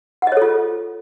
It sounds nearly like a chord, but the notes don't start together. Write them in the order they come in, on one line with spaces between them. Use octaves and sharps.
F#5 D#5 C#5 A4 F4